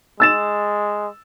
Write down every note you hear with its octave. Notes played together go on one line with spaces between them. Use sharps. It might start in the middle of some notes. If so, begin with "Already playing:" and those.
G#3 E6 A6 E7